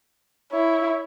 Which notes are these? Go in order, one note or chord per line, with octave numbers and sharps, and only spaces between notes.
E4 C#5